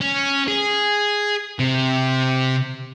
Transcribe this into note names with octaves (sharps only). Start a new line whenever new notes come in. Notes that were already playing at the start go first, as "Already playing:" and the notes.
C#4
G#4
C3